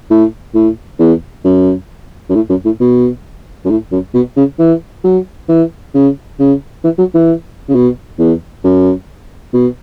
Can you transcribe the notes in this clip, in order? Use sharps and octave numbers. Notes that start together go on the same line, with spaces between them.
A2
A2
E2
F#2
F#2
A2
F#2
A2
B2
F#2
A2
F#2
B2
C#3
E3
F#3
E3
C#3
C#3
E3
F#3
E3
C#3
B2
E2
F#2
B2